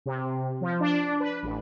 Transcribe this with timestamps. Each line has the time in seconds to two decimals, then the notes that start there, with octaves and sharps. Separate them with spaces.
0.06 C3
0.61 F3
0.80 D4
1.20 B4
1.43 A1